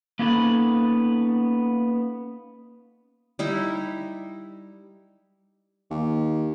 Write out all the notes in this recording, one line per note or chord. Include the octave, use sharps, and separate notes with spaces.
A#3 B3 C#4 D#4 A4 B4
G3 D#4 E4
D#2